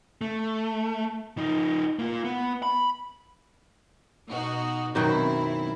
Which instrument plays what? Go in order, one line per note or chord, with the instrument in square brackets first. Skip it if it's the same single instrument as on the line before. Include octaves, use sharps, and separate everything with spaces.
[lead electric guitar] A3
F3 D#4
A#3 F4
B3
B5
[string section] B2 D#4 F#4
[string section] F#2 C4 E4 [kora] B2 D#3 F#3